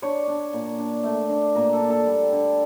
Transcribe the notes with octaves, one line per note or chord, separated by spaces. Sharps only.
D4 C#5
D4
A#2
D4
A3
D4
A#2 A#4
A4
D4
A4
G3
D3